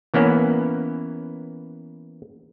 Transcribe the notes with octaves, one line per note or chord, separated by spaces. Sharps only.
E3 A#3 B3 C#4